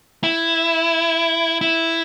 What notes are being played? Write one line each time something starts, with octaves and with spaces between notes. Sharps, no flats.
E4
E4